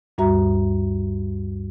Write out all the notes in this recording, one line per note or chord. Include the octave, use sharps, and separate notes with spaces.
D2 G2 G3 F#4 E5 A#5